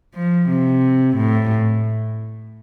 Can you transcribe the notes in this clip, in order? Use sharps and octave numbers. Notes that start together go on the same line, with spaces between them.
F3
C3
A2